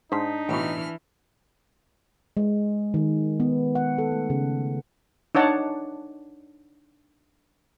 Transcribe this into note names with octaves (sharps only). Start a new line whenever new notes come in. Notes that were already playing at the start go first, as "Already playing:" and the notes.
G#2 D4 D#4 C5 B6
A1 B2 E3 F6
G#3
D#3
B3
F#5
A4
A3
C#3
D4 D#4 C#5 F#5 A5